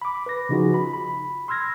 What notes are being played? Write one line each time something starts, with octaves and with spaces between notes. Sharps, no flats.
B5 D6
B4 A#6
C#3 F3 D#4 F4 F#4 G#4
B5
B5
C6 E6 F6 G#6 A#6